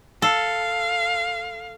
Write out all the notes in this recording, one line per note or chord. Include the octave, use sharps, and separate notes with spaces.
A4 F5